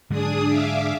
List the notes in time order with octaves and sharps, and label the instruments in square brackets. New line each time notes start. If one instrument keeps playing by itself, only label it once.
[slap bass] G#2 D3 F#3 [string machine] D4 G#4 D#6
[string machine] E5 F5 D6